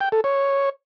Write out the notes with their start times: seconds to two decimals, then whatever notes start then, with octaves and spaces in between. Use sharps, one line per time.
0.01 G5
0.12 A4
0.24 C#5